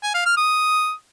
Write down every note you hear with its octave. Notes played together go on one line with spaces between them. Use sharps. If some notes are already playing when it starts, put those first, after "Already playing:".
G#5
F5
F6
D#6